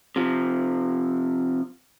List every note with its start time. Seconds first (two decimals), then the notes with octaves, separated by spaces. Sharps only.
0.16 C3 F3